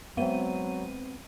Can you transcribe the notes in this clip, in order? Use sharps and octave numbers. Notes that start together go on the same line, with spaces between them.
F#3 G#3 B3 C4 D#7